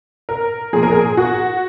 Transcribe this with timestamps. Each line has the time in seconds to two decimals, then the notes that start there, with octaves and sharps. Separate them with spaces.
0.29 A#4
0.73 A#2 F3 G#4
0.83 A#4
0.92 G#4
1.17 F#4